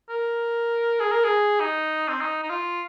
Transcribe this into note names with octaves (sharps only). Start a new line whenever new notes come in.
A#4
G#4
A#4
G#4
D#4
C4
D#4
D#4
F4